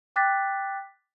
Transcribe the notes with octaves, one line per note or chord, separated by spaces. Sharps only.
G5 D6 F#6 A6 B6